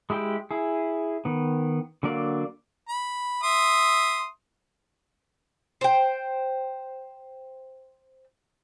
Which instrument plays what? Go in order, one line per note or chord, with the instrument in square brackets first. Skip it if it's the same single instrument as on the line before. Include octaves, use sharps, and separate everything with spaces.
[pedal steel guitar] G#3 E4 G4 G5
E4 G#4
D#3 B3
D3 F#3 A#3 D5 F5
[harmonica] B5
E5 C6 D#6
[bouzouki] C5 G5